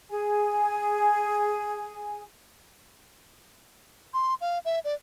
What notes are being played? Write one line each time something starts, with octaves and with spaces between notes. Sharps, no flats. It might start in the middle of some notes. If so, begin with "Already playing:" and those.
G#4 G#5
C6
F5
E5
D5